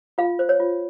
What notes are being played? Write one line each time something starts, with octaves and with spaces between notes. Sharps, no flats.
F4 F5
C5
C#5
F4